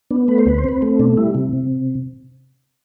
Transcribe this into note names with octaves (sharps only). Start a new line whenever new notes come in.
B3 D4
A3 B4
C5
D2 B4
C5
C4 B4
A3
B2 D4
G3 E4
C3
C3